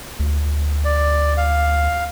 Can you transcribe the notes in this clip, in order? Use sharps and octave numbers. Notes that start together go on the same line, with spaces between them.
D2
D5
F5